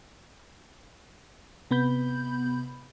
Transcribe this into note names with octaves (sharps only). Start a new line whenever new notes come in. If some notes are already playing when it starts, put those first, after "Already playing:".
C3 B3 B5 G6